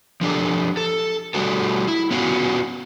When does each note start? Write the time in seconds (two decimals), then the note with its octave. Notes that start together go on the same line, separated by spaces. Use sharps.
0.21 F3 D4 G4 A4
0.77 A4
1.34 G3 A3 F#4 A4
1.88 E4
2.11 B3 C#4 F4 F#4